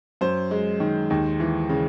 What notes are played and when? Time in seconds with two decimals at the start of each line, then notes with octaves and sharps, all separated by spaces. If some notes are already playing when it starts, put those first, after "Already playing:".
0.21 F#2 C5
0.51 G#3
0.80 D#3
1.10 D#2
1.40 E3
1.69 C#3